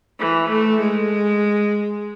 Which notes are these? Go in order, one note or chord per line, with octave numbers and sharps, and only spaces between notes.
E3
A3
G#3